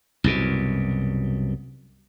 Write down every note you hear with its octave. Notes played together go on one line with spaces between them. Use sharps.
C2 F#2 B2